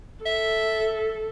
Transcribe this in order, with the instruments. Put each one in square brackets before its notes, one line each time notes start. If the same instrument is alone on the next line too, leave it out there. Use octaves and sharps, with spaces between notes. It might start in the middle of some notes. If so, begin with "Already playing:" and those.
[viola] A4 [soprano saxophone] E5